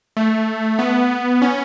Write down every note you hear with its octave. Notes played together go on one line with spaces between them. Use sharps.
A3
B3
C#4